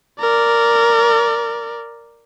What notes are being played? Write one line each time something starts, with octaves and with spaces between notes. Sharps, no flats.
A#4 D5